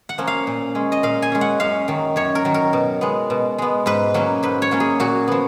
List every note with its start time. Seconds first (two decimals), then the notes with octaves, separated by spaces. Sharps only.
0.09 F#5
0.18 F3 A#3 C#4
0.27 F5
0.47 A#2
0.75 G#3 C#4
0.92 D#5
1.03 A#2 F5
1.22 G#5
1.32 G#3 C#4
1.41 F#5
1.60 F#2 F5
1.88 D#3 F#3
2.16 F#2 C#5
2.35 A#4
2.45 D#3 F#3
2.54 A#4
2.73 B2
3.01 G#3 B3
3.30 B2
3.58 G#3 B3
3.86 G#2 B4
4.14 F#3 A#3 C#4
4.43 G#2 B4
4.62 C#5
4.71 F#3 A#3 C#4
4.80 G#4
5.00 A#2 F#4
5.28 F3 B3